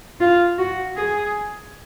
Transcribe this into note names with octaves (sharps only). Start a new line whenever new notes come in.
F4
F#4
G#4